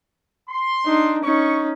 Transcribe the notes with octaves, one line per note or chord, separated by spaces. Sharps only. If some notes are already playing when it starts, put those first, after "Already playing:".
C6
D4 D#4
C#4 D#4 C#6